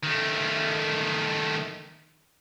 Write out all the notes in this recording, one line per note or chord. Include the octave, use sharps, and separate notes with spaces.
D#3 A3